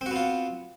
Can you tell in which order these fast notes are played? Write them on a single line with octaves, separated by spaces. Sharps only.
C4 F#4 B3 F4